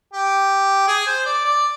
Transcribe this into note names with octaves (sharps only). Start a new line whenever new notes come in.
G4
G#4
C5
D5
D5